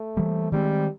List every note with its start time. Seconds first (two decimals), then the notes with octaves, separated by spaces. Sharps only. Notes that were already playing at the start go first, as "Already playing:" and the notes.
Already playing: A3
0.17 E3 G3 A#3
0.52 D#3 G3 G#3 C4